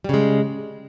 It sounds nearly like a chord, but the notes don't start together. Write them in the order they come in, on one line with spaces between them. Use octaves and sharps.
G3 C#3 G#3